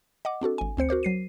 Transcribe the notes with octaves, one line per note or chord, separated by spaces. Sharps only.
D#5 F#5 D6
C4 D4 F#4 A4
G#1 G#5
D2 C4 C5 C#7
F#4 A#4 C5 D6
F#3 C7 D#7